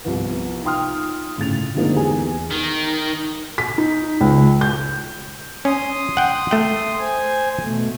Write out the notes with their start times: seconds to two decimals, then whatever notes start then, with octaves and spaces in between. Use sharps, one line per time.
0.04 C2 F3 B3
0.63 D#4 F4 G5 C6 D#6 F6
1.38 A2 C#3 A6 F7
1.75 D3 F3 G#3 A#3 C4 D#4
1.95 E2 G4 G#4 G#5
2.51 D#3
3.58 B6
3.78 D#4
4.21 C#2
4.61 G6
5.65 C#4 C6 D#6
6.17 F#5 G5
6.51 A3 G5
6.99 C5 G#5
7.62 B2 A3